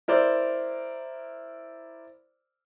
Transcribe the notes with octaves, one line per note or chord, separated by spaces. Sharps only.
E4 A#4 C5 D5